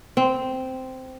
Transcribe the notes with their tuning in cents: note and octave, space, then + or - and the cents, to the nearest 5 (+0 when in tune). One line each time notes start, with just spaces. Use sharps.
C4 -10